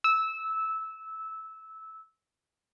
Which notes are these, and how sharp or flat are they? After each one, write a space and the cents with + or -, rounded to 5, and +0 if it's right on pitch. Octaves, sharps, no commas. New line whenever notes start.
E6 -15